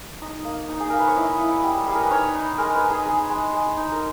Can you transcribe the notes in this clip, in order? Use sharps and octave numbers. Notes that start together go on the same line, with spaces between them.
D#4 D#5
A#3
D#4
G#4
A#3 A#4
B4
C#5
E4 D#5
E4
G3
G3 G#4
A#4
B4
D#4 C#5
D#4
G#3 A#4
B4
D#4
G#4
D#4 G#4
G#3
G#3
D#4
A#4